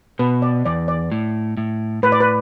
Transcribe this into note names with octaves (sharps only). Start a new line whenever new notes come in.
B2 B4
D5
E2 D5
D5
A2
A2
A2 B4
D5
B4